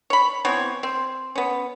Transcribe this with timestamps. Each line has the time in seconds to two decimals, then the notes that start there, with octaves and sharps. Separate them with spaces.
0.10 C#5 B5
0.45 E3 B3 C4 C#5
0.83 C4
1.35 B3 C#4